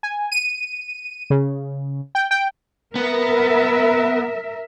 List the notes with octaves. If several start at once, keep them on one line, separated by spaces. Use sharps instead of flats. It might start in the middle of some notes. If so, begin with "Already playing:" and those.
G#5
D#7
C#3
G5
G5
B3 A#4 E5